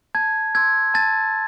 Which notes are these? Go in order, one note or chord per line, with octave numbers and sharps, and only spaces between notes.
A5 G#6
C6 E6 G#6
A5 A6